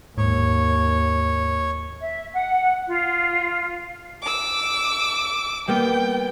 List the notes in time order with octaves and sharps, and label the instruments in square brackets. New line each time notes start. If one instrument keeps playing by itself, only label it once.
[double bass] D#2 [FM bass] G#2 [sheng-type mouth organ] C#5
[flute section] E5
F#5
F4
[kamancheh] D6 E6
[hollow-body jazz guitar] G3 A#3 B3 [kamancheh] G5